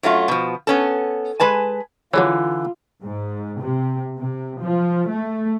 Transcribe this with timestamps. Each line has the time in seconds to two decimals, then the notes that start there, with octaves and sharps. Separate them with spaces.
0.03 F#2 F#3 A3 F4
0.28 B2 F3
0.67 B3 C#4 A4
1.40 G#3 B4 G#5 A5
2.14 D3 E3 F#3 G#3 C#4 F4
3.03 G#2
3.61 C3
4.18 C3
4.62 F3
5.08 A3